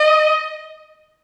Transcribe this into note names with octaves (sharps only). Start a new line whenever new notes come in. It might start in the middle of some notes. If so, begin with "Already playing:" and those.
Already playing: D#5